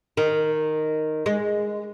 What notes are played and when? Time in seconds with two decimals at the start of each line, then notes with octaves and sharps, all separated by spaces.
0.17 D#3
1.26 G#3